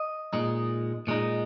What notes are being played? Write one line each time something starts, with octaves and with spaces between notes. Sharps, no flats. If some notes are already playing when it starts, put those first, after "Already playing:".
Already playing: D#5
A#2 G#3 D#4
A#2 G#3 D#4